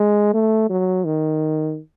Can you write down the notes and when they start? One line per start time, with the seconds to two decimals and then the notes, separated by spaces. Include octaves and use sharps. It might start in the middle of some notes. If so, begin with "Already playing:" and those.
Already playing: G#3
0.34 A3
0.70 F#3
1.05 D#3